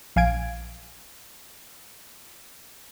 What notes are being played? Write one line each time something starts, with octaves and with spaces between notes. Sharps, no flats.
A#1 F5 G#5 G#6 D7